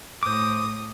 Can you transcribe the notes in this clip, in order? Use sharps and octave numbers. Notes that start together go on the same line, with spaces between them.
A2 C5 D6 D#6